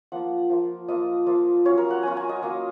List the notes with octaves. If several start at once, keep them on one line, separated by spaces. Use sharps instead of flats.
F3 A#3 F4 F#5
F3 A#3 F4
F3 A#3 F4 D#5
F3 A#3 F4
F#3 C#4 F4 C#5
A#4
F#5
F#3 C#4 F4 G#5
G#5
D#5
F#3 A#3 F4